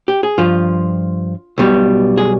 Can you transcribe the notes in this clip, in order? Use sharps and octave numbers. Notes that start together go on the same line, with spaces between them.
G4
G#4
G2 F3 F4
B1 B2 G3
G#4